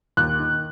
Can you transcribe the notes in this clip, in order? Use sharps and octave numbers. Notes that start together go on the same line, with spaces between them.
D#2 F#6
D#3